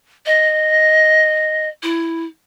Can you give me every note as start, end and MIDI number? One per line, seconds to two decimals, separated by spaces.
0.26 1.69 75
1.83 2.24 64